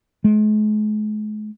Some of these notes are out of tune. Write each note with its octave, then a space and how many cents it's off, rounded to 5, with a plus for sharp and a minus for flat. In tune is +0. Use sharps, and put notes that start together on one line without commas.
G#3 +45